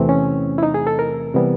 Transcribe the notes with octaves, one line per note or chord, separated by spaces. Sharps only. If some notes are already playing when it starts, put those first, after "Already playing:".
Already playing: E2 C3 E3 A3 C4
C#4
E4
D#4
G#4
A4
A#4
C3 E3 G3 B3